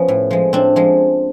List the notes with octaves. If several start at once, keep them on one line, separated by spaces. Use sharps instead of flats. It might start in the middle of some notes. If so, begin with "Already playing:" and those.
Already playing: F3 B3 C#4
A2
F3 G#3
A2 C4 D4
F3 G#3